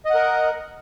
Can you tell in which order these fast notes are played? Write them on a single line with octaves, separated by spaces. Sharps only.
D#5 F#5 A#4